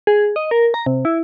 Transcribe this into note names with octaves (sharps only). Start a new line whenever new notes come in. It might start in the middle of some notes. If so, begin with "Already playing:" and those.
G#4
D#5
A#4
A#5
C3
E4